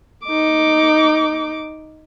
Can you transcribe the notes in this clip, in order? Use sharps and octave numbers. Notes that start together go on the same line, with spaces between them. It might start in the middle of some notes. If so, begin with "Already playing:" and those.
D#4 D6